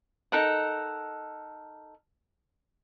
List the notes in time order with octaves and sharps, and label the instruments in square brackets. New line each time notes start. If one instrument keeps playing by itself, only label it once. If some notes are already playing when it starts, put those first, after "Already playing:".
[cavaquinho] D#4 A4 A#4 F#5